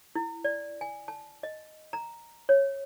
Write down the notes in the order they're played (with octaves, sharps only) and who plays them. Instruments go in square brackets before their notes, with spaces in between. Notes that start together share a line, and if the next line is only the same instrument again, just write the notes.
[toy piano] E4
D5
G#5
A5
D#5
A#5
C#5